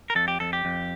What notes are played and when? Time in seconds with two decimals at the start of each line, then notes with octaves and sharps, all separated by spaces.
0.10 A#4
0.15 F2 A4
0.28 G4
0.40 F2 A4
0.53 G4
0.65 F2